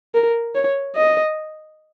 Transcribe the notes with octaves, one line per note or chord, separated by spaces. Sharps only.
A#4
C#5
D#5